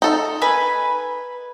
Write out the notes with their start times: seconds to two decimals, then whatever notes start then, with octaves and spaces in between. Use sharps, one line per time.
0.02 D#4 A4
0.42 B4 G#5 B5